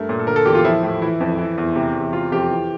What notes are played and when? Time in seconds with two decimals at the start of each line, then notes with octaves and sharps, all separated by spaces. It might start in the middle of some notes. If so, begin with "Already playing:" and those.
Already playing: G2 A3 A#4
0.09 A#2
0.19 A4
0.27 D3 A#4
0.36 A4
0.45 E2 G4
0.55 F4
0.64 F3 E4
0.83 A2
1.01 E3 E4
1.20 F2
1.38 E3
1.57 E2
1.76 C3
1.95 E2
2.13 C3 F4
2.32 F2 G4
2.50 E3